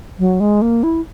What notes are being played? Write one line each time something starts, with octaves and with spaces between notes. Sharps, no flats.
F#3
G#3
A#3
E4